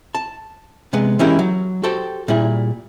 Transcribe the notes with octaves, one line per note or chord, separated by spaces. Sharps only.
A5
C3 G#3 B3
E3 G#3 C#4 E4 G4 A#4
F#3
F#4 G4 A4 C5 G5 A5
A#2 G3 E4 G#4